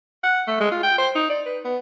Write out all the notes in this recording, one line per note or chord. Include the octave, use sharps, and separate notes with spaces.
F#5
A3
G#3
F4
G5
C5
D#4
D5
B4
B3